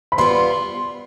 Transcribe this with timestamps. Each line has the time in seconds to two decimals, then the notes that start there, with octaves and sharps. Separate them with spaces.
0.12 B5
0.18 G3 B3 F4 C6